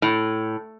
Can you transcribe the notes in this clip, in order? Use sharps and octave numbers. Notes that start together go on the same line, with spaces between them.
A2